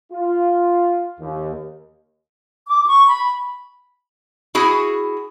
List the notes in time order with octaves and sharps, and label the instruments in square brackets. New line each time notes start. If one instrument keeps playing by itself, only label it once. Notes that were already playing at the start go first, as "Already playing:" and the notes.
[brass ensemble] F4
D#2
[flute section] D6
C#6
B5
[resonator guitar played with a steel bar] E4 F#4 G#4